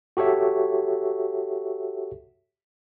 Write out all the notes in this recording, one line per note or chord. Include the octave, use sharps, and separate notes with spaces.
F#4 G4 A4 C#5 E5